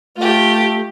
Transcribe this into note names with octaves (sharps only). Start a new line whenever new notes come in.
A3 F4 G4